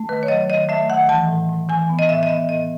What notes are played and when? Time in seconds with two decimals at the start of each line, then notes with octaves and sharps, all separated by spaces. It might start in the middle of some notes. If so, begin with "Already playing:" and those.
Already playing: A3
0.09 D#3 B4
0.23 C#5
0.28 F#3 D#5
0.49 D#3 D#5
0.69 A3 E5
0.89 D#3 F#5
1.09 E3 A5
1.28 A2
1.49 A2
1.69 E3 G#5
1.89 B3
1.99 D#5
2.09 A2 E5
2.23 D#5
2.29 B3 E5
2.49 A2 D#5